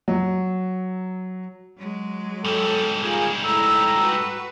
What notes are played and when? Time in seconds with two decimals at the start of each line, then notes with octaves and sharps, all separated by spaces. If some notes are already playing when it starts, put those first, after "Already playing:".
0.08 F#3
1.78 F#3 G#3
2.44 G#2 G3 A4
3.02 F4 G#4 A#4
3.44 A3 E4 A4 A#5 E6
3.99 F#4 B4